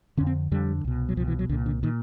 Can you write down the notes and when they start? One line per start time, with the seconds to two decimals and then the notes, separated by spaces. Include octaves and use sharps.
0.17 F2 D3 C#4
0.27 C4
0.51 F2 D3 G3
0.85 C2 B2
1.09 F#3
1.16 C2 F3
1.20 B2
1.28 E3
1.39 F#3
1.49 C2 D3
1.52 A#2
1.66 D3
1.83 A#2 D#3